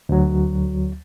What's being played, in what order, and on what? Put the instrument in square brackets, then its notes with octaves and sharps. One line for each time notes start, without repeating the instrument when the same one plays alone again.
[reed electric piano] D2 F#3